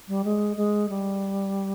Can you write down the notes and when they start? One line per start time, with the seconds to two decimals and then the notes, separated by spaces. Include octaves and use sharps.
0.08 G3
0.24 G#3
0.57 G#3
0.89 G3